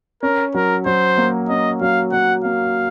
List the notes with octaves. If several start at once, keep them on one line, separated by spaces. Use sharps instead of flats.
C#4 A#4
F#3 A#4
F#3 C5
A#3
C#4 D#5
F#3 F5
F#3 F#5
A#3 F5